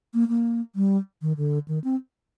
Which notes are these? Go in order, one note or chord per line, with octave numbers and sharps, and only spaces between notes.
A#3
A#3
G3
D#3
D3
D#3
C4